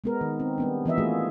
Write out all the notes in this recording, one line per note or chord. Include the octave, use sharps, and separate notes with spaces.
G#3 B3 A#4
D#3
C4
G3 B3 D4
E3 B3 D#5 E5
A3 A#3 F4 F#4 G#4